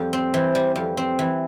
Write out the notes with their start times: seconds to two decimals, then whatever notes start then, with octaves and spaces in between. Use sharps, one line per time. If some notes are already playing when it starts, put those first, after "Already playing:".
Already playing: F2 G3
0.13 C4
0.34 E3 C5
0.55 G3
0.76 F2
0.97 C4
1.19 E3